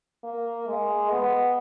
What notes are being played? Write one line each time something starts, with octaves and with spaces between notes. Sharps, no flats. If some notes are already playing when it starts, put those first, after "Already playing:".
A#3
G#3
B3